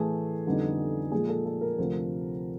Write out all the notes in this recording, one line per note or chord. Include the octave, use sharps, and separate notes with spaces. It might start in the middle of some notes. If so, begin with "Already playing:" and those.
Already playing: A2 E3 A3 G#4
F2 D3 G3 B3 D#4
A#2 F3 G#3 G#4
A4
A4
A#4
D2 C3 F3 A3 C4